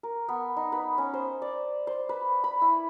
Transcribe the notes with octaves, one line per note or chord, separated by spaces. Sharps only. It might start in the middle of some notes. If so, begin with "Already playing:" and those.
A#4
B3
D#4
B4
C#4
C5
D5
C5
B4
B5
E4